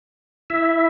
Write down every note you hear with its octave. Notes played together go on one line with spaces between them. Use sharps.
E4 E5